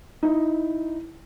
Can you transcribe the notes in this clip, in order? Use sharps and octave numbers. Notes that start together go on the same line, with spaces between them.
D#4 E4